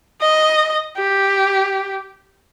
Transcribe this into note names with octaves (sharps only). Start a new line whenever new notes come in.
D#5
G4